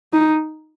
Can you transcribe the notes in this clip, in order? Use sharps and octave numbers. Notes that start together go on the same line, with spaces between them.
D#4